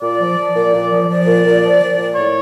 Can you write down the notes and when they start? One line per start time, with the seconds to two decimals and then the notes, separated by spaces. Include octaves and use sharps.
0.01 A#2 D5
0.19 F3
0.37 F3
0.55 A#2
0.73 A#2
0.90 F3
1.08 F3 D5
1.26 A#2
1.44 A#2
1.62 F3
1.80 F3
1.97 A#2
2.15 A2 C#5